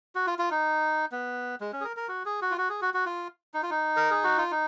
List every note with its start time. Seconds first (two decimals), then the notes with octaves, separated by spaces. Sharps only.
0.15 F#4
0.27 F4
0.39 F4
0.51 D#4
1.12 B3
1.61 G#3
1.73 C#4
1.81 G#4
1.85 A#4
1.97 A#4
2.08 F#4
2.25 G#4
2.42 F#4
2.51 F4
2.58 F#4
2.70 G#4
2.82 F#4
2.94 F#4
3.06 F4
3.54 D#4
3.63 F4
3.70 D#4
3.96 A#4
4.11 G#4
4.24 F#4
4.38 F4
4.51 D#4